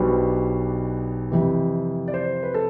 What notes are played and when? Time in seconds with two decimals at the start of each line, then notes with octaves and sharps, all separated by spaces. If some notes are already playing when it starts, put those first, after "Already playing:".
Already playing: B1 B2 G3 B3 D4 C5
1.31 F2 C3 E3
2.08 D5
2.14 C5
2.43 B4
2.54 A4